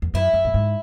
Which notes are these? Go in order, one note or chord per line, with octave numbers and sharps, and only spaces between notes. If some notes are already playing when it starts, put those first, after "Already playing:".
E2
F#2 E4
F#2
A2
G#2